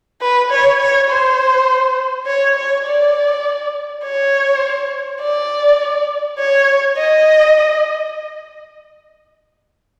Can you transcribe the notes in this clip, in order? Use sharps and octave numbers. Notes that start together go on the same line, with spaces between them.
B4
C#5
C#5
C5
C#5
C#5
D5
C#5
D5
C#5
D#5